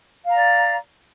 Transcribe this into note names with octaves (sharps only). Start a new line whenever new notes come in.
D5 F5 A#5